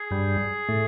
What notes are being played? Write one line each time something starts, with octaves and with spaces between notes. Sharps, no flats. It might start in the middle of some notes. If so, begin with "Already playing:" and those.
Already playing: G#4
G2 G3
A2 A3